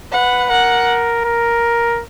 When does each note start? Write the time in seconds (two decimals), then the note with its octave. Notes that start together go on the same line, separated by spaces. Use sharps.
0.12 B4 F#5
0.50 A#4 F#5
1.25 A#4